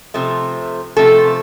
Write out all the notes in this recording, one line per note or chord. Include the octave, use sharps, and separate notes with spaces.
C3 F3 A3
C3 F3 A3 A4